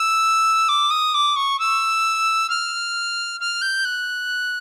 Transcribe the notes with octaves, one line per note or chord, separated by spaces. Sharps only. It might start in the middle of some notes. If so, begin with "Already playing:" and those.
Already playing: E6
D6
D#6
D6
C#6
E6
F6
F6
G6
F#6